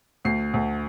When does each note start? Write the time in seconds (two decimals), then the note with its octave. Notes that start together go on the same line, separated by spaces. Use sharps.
0.25 D2 C7
0.54 D2